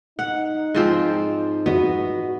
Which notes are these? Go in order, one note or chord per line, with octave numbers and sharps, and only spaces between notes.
D#4 F#5
G#2 F3 C4
B3 F#4 D#5